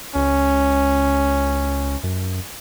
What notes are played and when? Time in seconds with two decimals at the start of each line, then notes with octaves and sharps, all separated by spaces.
0.15 C#2 C#4
2.03 F#2